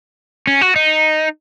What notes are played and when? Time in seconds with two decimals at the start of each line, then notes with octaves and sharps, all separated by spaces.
0.47 C#4
0.61 F#4
0.76 D#4